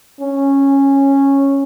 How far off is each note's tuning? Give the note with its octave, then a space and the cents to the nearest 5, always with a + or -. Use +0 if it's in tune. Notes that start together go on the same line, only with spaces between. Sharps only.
C#4 -10